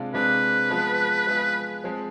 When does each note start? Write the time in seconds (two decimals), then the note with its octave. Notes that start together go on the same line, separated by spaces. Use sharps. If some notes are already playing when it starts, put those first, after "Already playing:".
Already playing: C3 G#3 D4 F4
0.14 C3 G#3 D4 F4 B4
0.71 F3 G#3 B3 F4
1.27 F3 G#3 B3 F4
1.84 F3 G#3 C4